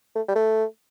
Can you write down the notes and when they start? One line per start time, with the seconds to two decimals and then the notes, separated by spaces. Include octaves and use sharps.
0.16 A3
0.28 G3
0.35 A3